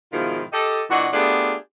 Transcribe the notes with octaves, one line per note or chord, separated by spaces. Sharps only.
G#2 B2 D#3 F3 E4 F4
G4 A4 D#5
A#2 E3 D4 F#4 D#5 F#5
A3 B3 D4 F4 G4 G#4